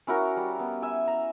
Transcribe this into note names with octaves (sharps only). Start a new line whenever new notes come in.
C#4 E4 F#4 A#4
G3
B3
E5 G#5
A#5